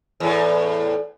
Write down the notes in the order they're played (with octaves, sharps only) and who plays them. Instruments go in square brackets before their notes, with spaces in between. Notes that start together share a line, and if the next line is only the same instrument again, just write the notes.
[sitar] E2 A2